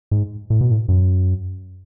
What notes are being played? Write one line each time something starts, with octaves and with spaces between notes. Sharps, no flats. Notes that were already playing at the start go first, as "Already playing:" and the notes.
G#2
A2
B2
A2
F#2